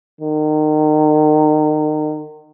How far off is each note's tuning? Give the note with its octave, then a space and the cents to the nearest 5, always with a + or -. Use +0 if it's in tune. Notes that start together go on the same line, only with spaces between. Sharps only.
D#3 -30